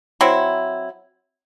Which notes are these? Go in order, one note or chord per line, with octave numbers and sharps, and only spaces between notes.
F#3 C4 E4